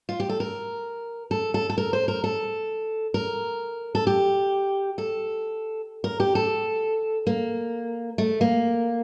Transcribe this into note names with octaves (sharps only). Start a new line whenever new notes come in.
F4
G4
A4
A#4
A4
A4
A4
A#4
C5
A#4
A4
A#4
A4
G4
A4
A#4
G4
A4
A#3
A3
A#3